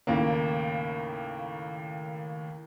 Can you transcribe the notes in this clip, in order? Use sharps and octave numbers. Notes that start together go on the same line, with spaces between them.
D#2 A2 C#3 A#3